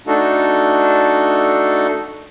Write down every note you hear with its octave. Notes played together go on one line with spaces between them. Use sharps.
A3 D4 D#4 F#4 A4